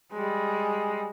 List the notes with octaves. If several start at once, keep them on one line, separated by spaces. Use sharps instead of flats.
G3 G#3